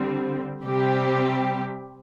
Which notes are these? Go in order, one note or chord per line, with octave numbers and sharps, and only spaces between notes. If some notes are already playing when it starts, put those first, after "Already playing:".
Already playing: D3 G3 C4
C3 G3 C4 G4